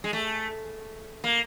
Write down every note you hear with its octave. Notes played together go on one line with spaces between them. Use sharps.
G#3
A3
A#3